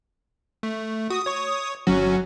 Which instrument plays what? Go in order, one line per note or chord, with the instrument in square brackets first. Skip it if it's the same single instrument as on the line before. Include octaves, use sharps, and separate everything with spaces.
[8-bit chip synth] A3
[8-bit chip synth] F#4 [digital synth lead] D#6
[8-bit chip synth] C#5 C#6
[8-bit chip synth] G1 C#4 F#4 [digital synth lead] F#3